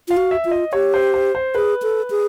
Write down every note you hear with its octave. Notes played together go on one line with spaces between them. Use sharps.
F4 F5
F#4
E5
F4
D#5
G4 C#5
C5
C5
C5
G#4 B4
A4
G#4